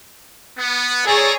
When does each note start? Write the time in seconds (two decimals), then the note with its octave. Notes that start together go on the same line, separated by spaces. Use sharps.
0.58 B3
1.06 G#4 A4 C#5 D5 A#5